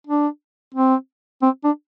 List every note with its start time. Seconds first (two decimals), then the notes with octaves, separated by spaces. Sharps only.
0.07 D4
0.74 C4
1.42 C4
1.64 D4